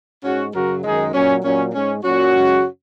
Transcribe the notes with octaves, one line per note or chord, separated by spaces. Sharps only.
G#2 G#3 C#4 F#4
F#2 C#3 F#3 F#4 A#4
F#2 D#3 G#3 D#4 G#4
A#2 F#3 C#4
A#2 F#3 C#4
G#2 G#3 C#4
A#2 F#3 C#4 F#4
F#2 C#3 G#3